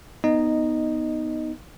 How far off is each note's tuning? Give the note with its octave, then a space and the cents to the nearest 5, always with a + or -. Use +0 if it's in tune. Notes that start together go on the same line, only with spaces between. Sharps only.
B3 +0 D#4 +0 D#5 -10